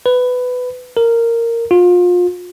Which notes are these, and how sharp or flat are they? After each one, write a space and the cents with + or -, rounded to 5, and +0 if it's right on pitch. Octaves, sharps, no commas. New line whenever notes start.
B4 +15
A#4 -10
F4 +30